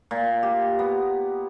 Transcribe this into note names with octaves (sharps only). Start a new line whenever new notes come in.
A#2
G4
B3